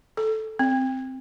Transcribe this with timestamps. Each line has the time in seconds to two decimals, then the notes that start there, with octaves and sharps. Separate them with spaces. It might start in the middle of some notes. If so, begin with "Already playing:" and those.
0.17 A4
0.59 C4